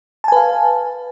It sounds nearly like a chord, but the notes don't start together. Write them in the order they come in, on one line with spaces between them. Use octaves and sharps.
A5 G#5 B4 F5